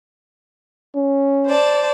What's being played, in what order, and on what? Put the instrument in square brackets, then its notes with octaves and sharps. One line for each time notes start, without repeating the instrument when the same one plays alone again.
[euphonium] C#4
[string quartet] C5 D5 A5